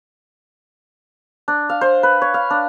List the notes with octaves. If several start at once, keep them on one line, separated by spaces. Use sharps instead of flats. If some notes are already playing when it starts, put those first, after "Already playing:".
D4
F5
C5
B4
C#5
F5
D4